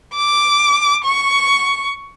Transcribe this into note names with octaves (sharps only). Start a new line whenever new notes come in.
D6
C#6